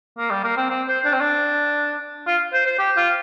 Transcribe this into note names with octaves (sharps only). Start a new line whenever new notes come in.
A#3
G3
A#3
C4
C4
C5
D4
C4
D4
F4
C5
C5
G4
F4